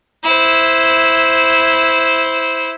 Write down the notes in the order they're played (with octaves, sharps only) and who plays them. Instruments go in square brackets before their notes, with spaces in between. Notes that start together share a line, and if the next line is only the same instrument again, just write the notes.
[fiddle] E4 C5